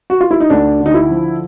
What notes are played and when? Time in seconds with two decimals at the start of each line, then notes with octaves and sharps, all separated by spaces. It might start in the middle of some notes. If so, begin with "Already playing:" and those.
0.10 F#4
0.21 F4
0.31 E4
0.40 D#4
0.50 D2 D4
0.80 D3
0.86 D#4
0.94 E4
1.11 F3